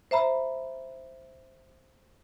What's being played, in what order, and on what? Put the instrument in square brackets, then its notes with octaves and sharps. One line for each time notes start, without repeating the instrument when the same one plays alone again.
[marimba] C5 E5 A#5 B5